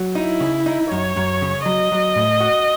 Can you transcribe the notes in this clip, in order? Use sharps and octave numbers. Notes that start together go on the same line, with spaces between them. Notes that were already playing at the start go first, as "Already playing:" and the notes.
Already playing: F#3
D#4 E4
C#3
D#4
F#2 C#5
F#2
C#3
F#3 D#5
F#3
A2
F#4